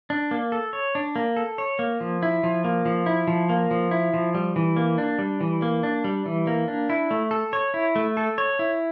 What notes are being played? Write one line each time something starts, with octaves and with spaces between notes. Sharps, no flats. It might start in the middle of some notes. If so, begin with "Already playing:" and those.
D4
A#3
A4
C#5
D4
A#3
A4
C#5
A#3
F3
E4
F3
A#3
F3
E4
F3
A#3
F3
E4
F3
G3
E3
A#3
D4
G3
E3
A#3
D4
G3
E3
A#3
D4
E4
A3
A4
C#5
E4
A3
A4
C#5
E4